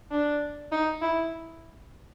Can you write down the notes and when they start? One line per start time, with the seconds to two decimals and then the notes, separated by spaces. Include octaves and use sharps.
0.11 D4
0.72 D#4
1.02 E4